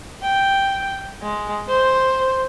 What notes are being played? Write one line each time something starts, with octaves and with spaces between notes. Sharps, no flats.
G5
G#3
C5